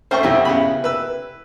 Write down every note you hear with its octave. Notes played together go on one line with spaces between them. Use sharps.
A3 C4 C#4 C5 G5 C#6
B1 F2 C#4 E4 G4
C#3 B3 B5
B4 E6